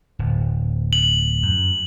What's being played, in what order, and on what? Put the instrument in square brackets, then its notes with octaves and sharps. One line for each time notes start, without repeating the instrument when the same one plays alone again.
[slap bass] D1
[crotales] F#7
[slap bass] F#2